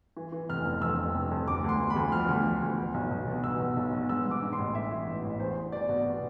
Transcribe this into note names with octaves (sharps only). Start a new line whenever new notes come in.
E3
E3
F1 F6
F1
F2 E6
F1
F1
F2
D2 D6
D2 C6
D2
B5
D2
F3 F6
D2
F3
D2
B2
B1
B1
B2
B1 E6
B2
B1
B2
G#2 E6
G#2
D6
G#2
C6
A1
E3 E5
E3
A1
A1
E2 C5
E2
B2 D5
B2
B2